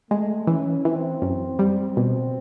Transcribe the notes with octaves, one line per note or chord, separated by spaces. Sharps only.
G#3 A3
E3 C#4
E3 C4
F#2
G3
B2